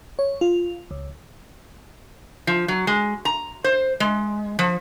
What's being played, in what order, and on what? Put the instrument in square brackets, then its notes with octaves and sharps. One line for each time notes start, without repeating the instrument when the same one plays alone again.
[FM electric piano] C#5
F4
C#2
[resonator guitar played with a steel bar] F3
F#3
G#3
A#5
C5
G#3
F3